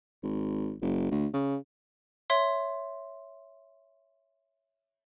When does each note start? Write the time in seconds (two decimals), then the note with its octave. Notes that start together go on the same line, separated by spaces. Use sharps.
0.23 G#1
0.82 F#1
1.11 D2
1.33 C#3
2.30 C#5 E5 C6